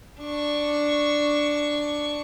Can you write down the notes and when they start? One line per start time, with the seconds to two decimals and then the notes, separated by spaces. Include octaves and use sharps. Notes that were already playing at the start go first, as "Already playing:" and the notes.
0.21 D4 C#6